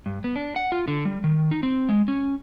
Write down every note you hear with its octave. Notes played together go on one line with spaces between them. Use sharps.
G2
B3
D4
F#5
F4
D3
G3
D#3
D#4
C4
G#3
C#4